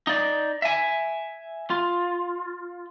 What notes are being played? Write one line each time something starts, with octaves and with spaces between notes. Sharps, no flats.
D#4 D5
E5 G#5
F4